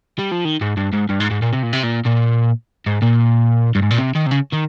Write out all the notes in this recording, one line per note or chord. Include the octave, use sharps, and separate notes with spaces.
G3
F3
D#3
G#2
G2
G#2
G2
G#2
G#2
A#2
C3
A#2
C3
A#2
A#2
G#2
A#2
G2
G#2
A#2
C3
D#3
C3
C#3
D#3